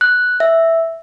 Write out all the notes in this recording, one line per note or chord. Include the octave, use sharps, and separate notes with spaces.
F#6
E5